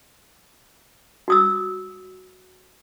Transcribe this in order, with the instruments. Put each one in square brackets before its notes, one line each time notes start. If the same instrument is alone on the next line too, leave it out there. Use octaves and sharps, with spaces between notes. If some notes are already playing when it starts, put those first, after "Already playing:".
[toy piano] F#4 D#6 E6